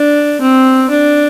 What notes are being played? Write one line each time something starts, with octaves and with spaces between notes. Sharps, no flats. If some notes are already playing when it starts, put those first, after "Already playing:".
Already playing: D4
C4
D4